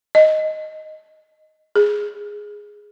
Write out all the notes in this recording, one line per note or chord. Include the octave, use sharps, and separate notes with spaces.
D#5
G#4